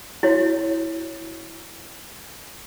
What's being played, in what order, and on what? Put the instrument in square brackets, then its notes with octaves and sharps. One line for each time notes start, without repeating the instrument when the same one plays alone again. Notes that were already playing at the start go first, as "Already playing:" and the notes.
[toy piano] E4 F#4 C#5